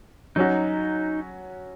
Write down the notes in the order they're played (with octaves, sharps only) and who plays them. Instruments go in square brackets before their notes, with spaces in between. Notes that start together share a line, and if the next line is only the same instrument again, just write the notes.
[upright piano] F#3 C#4 F#4 [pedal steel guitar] D#4